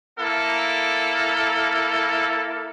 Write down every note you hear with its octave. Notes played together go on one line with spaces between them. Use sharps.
A#3 E4 A4